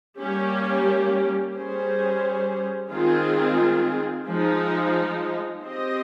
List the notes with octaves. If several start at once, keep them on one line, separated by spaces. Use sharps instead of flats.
G3 A#3 C#4 G4
G3 C#4 G#4 C5
D#3 G#3 C4 F4 G#4
F3 G#3 D#4
C4 G4 C5 D#5